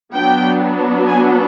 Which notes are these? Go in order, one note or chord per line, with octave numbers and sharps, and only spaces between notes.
F#3 B3 D4 G5
G#5